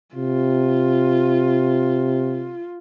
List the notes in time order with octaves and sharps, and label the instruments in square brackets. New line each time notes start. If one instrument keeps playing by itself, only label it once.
[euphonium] C3 [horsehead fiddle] F4